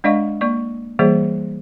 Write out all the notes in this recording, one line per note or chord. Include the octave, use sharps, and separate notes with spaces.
G#3 D4 D5 D#5 F5 C#6
A#3 D5 C#6
E3 G3 A#3 G#4 C5 D5